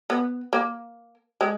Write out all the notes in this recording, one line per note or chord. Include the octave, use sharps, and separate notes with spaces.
B3
A#3
G#3